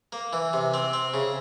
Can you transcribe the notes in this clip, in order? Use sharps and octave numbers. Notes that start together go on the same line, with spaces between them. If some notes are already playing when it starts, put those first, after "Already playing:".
A#3
E3
C3
C4
C4
C#3